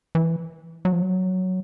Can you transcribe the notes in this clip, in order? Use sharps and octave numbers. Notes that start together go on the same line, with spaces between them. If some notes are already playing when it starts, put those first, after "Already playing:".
E3
F#3
F3
F#3